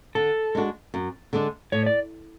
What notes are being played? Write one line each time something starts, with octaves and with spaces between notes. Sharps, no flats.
D3 A4
G#3 D4 F#4
F#2
D3 G#3 D4
A2 C#5
D5